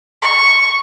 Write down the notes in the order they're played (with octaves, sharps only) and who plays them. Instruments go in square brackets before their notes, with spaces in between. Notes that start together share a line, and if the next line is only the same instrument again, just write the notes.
[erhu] C#6